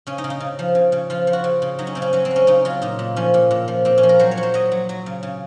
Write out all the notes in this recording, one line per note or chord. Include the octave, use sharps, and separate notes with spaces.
C#3 C#4
D#4
C#3
D#4
C#3
F3
C#3
C#3
F3 F4
F3
F#4
C#3
C#3
F#3 D#4
C#4
C#3 C4
C#4
F#3 C#4
C4
F#3
C#4
C#3 D#4
F#3 F4
A#2 D#4
A#2
F3 C#4
A#2
A#2
F3
A#2 C4
C#4
F3
A#4
F#3 C5
C#5
F#3
C5
F#3 D#5
F#3
F#3
C#3
C#3